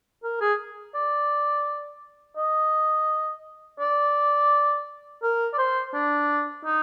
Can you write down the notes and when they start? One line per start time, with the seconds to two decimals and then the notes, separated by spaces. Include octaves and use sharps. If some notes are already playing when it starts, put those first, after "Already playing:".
0.23 A#4
0.41 G#4
0.95 D5
2.37 D#5
3.80 D5
5.23 A#4
5.54 D5
5.58 C5
5.94 D4
6.65 D#4